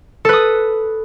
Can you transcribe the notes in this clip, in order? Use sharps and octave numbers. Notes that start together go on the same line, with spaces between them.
A4 B4 D#6